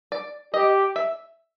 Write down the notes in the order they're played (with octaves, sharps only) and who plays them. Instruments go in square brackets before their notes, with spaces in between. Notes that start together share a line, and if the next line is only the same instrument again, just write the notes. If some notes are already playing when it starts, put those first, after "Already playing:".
[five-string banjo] D5
[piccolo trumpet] G4 [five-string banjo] D#5
[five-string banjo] E5